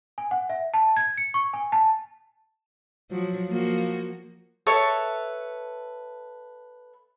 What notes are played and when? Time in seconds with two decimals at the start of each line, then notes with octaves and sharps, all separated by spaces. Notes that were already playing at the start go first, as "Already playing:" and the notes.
0.18 G#5
0.31 F#5
0.50 E5
0.74 A5
0.97 G#6
1.18 C#7
1.34 C#6
1.53 G#5
1.72 A5
3.11 F3 F#3
3.49 F3 A#3 F#4
4.67 A4 B4 C#5 E5